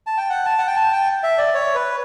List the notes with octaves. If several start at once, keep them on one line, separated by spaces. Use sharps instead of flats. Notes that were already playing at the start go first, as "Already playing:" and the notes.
A5
G5
F#5
A5
F#5
G5
A5
G5
E5
D5
C#5
B4